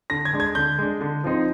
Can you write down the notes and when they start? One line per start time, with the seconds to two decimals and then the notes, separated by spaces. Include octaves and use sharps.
0.10 D3 A#6
0.25 G#6
0.33 G#3 D4
0.40 G#6
0.55 D3 G6
0.78 G#3 D4
1.01 D3
1.24 F3 C4 D#4